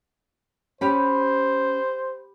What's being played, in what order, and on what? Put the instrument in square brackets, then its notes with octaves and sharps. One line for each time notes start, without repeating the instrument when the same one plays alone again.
[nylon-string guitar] C#4 [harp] G4 B5 [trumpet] C5